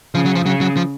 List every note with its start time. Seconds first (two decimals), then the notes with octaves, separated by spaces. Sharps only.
0.15 C#3 F3
0.26 F#3
0.35 F3
0.46 C#3 F#3
0.61 F#3
0.76 F3